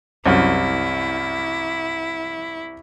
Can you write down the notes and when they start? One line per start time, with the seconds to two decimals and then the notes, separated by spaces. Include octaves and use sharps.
0.26 C2 F#2 E4